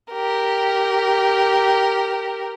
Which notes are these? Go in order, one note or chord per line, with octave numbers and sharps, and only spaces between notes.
G4 A#4